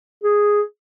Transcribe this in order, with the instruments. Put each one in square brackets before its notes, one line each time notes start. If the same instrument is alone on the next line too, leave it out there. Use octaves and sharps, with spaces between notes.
[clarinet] G#4